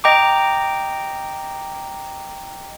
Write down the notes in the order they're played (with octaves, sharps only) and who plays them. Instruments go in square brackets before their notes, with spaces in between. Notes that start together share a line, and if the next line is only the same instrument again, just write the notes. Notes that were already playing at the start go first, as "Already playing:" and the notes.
[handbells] D#5 G5 A#5 D6